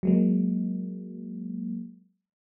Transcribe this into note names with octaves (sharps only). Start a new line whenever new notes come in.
F#3 G#3 A#3